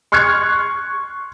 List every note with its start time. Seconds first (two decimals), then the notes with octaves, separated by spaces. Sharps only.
0.12 C6 C#6 F6 F#6 G#6 C#7